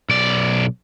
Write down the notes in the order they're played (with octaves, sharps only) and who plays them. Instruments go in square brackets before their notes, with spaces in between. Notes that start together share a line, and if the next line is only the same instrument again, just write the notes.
[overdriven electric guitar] B1 D5